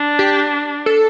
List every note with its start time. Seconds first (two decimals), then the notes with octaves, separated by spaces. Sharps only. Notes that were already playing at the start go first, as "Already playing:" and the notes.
Already playing: D4
0.19 G4
0.86 A4